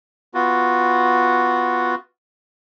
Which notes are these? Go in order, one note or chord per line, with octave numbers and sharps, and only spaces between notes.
B3 F4 F#4